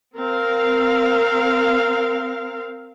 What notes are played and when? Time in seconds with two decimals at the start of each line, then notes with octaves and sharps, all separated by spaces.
0.16 C4 A#4 F5